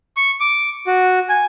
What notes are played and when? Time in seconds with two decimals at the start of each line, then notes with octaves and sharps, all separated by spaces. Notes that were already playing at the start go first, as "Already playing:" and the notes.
0.17 C#6
0.40 D6
0.87 F#4
1.29 G#5